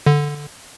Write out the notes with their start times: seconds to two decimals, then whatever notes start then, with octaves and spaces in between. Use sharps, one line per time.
0.06 D3